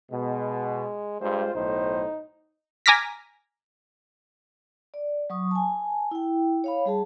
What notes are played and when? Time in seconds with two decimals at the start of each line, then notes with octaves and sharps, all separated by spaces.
0.12 B2 G#3
1.21 G2 G#3 F4 C5
1.55 B1 A2 D#4 C5
2.86 G#5 A#5 D6 F6 A#6 B6
4.94 D5
5.30 F#3 C#6 D#6
5.51 G#5 A5
6.11 E4 G5
6.64 C#5 F5 B5
6.86 G3 G#4 A5